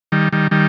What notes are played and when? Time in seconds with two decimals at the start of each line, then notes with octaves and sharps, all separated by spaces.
0.12 D#3 G3
0.33 D#3 G3
0.51 D#3 G3